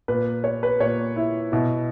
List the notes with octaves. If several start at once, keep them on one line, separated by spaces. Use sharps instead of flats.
A#2 B4
C#5
B4
A#2 C#5
E4
B2 E4